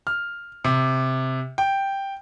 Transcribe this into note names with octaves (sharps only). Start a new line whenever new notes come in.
F6
C3
G5